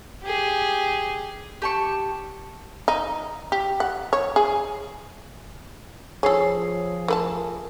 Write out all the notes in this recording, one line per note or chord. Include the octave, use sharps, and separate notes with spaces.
G4 G#4
G4 A5 C#6
D#4
G4
F#5
C#5
G#4
F3 C#4 G#4 A4 C#5 C7
A3 A#4 B4 A5